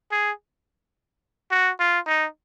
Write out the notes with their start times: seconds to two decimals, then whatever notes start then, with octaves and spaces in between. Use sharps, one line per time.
0.12 G#4
1.51 F#4
1.80 F4
2.07 D#4